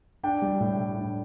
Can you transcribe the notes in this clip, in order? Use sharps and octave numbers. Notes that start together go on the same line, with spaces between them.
D4 G5
G3
A2
A2
D4